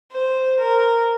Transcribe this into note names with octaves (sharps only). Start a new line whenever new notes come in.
C5
A#4